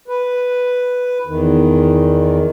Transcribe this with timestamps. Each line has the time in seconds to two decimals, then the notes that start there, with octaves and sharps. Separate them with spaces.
0.08 B4
1.27 E2 D#3